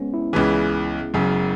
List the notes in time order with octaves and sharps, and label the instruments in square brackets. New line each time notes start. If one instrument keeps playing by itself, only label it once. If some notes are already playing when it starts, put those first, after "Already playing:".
Already playing: [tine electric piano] G#3 B3 C#4
E4
[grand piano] C#2 C#3 E3 [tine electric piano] G#4
[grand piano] F#1 F#2 C#3